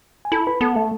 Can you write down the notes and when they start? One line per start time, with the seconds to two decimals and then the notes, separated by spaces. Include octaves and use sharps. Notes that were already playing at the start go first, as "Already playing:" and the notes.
0.25 G#5
0.32 E4 A4 A5
0.47 B4 B5
0.61 B3 A4 A5
0.75 A3 A4 A5